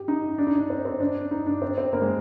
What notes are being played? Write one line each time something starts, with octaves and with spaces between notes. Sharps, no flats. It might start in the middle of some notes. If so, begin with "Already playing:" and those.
Already playing: G4
D#4
D4
D#4
D4
C4
C4
D4
D#4
D4
C4
C4
A#3
G#3